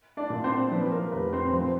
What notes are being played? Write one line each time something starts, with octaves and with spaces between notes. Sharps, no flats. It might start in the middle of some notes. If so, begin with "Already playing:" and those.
D4 D5
A#2
C4 C5
F3 B4
A#4
F1 B4
C4 C5
F3 C4 C5